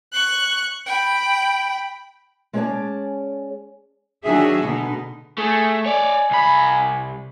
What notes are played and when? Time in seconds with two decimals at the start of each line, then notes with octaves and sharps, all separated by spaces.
0.13 C#6 F#6
0.86 G5 B5
2.53 G#3 C#4 G#4 C#5 D5 A5
4.24 D#3 F#3 D4 F#4 G#4 E5
4.63 B2 D3 B3 D#4
5.38 A3 G#4 A4
5.86 C#5 D5 G#5
6.31 C2 B5